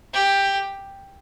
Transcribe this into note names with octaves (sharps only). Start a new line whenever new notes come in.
G4